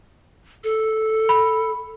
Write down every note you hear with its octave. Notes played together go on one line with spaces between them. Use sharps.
A4
B5